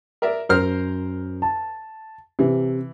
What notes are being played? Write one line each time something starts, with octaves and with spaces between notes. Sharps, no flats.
A#4 D5 E5
F#2 A#4 C5 F6
A5
C3 E3